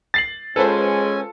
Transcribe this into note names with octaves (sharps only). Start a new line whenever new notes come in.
A6 C7 F#7
G#3 C#4 F4 A4 B4 C5 G#5